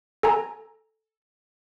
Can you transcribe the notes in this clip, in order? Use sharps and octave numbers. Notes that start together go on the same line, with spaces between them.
A4 G#5 A#5